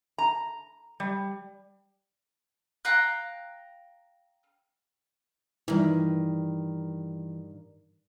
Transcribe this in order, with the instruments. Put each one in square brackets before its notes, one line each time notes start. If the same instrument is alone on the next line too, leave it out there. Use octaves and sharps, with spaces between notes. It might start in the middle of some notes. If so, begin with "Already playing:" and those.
[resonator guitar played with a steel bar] A#5
G3
[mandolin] F5 G5 A#5 F#6
[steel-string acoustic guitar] G2 D#3 [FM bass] E3